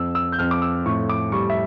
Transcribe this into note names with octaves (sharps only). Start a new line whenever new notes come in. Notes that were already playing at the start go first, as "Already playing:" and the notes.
Already playing: F2 E6
E6
G6
F2 F6
D6
E6
A2 C#6
D6
G3 C#6
E5